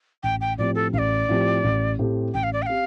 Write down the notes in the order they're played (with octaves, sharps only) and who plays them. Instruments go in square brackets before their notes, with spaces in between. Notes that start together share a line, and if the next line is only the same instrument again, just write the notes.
[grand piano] A1 [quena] G5
[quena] G5
[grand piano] A2 F3 C4 G4 [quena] D5
[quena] A4
[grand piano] A1 [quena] F5
[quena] D5
[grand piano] A2 F3 C4 G4
A1
A2 A3 C4 G4
[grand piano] A1 [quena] G5
[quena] F5
D5
G5
[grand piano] C4 G4 [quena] F5